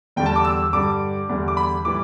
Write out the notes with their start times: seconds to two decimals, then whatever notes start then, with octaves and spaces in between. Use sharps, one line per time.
0.16 E2 D3 G3 G5
0.26 A5
0.36 D6
0.45 E6
0.73 G2 D3 G3 D6
1.29 E2 D3 G3
1.48 D6
1.57 B5
1.84 A2 E3 G3 D6